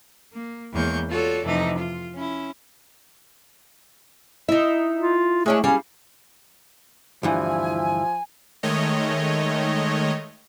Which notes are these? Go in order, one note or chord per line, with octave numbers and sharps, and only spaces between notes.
A#3
E2 G#3 A#3 C#5 C#6 G6
F4 F#4 A4 C#5 D5
F2 C3 E3 A3 D#4
F4
C#4 E4
D#4 E4 E5
F4
G#3 A3 C#4 D4
G3 C#4 G#4 F5
D2 G2 E3 F3 E4 G#5
D#3 G#3 A3 C#5 D#5